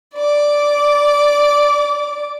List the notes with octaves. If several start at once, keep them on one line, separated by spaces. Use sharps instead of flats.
D5 D6